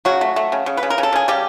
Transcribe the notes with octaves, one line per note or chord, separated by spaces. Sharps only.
C#3 F#3 F#4
A3
A3
C#3
C#3
B4
C#3
A#4
C#3
A4
C#3 G#4
C#3 G3 G4